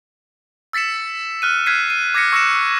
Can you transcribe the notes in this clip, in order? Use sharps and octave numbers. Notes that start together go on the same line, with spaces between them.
E6 A6 B6 C#7 E7
F6 F#6 D#7
F6 F#6 G#6 B6 C7 D#7
D#7
D6 G#6 A#6 B6 C#7
C#6 E6 F#6 A#6 C#7 E7